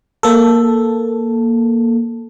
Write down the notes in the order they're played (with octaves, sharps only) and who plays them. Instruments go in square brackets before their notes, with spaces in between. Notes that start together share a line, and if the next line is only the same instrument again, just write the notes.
[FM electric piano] A#3 A4